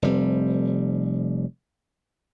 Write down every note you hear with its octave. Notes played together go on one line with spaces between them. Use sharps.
F1 G3 C4